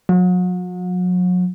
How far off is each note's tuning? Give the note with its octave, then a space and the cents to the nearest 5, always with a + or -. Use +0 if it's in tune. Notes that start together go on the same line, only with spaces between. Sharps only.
F#3 -40